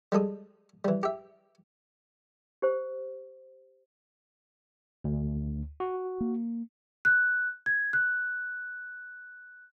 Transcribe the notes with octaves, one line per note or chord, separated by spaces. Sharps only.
G3 G#3 A4 D#6
E3 G3
G4 E5
G4 C5
D2
F#4
A#3
F#6
G#6
F#6